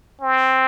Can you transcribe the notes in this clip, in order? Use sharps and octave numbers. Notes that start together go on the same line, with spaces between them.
C4